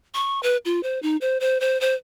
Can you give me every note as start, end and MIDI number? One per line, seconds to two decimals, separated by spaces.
0.14 0.42 85
0.43 0.57 71
0.65 0.83 65
0.83 1.01 72
1.03 1.17 63
1.21 1.38 72
1.40 1.60 72
1.60 1.79 72
1.81 1.95 72